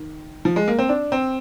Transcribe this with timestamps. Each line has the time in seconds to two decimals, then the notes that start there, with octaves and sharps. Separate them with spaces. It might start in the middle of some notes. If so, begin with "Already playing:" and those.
Already playing: D#3
0.45 F3
0.56 G#3
0.68 A#3
0.79 C4
0.89 D4
1.12 C4